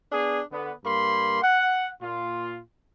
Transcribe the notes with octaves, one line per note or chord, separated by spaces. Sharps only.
B3 D4 G#4
D3 B3
G2 A#3 B5 C6
F#5
A#2 F4